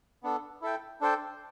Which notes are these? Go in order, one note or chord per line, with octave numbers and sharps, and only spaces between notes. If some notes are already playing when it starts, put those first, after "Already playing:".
B3 D4 A4
E4 A4 E5 G5
D4 A4 C5 G5